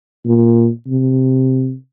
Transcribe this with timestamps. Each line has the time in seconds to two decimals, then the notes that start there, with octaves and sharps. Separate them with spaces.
0.25 A#2
0.87 C3